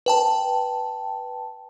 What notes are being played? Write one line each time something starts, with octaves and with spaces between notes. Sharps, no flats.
B4 G5 A5